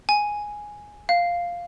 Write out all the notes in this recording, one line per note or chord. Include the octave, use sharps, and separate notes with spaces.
G#5
F5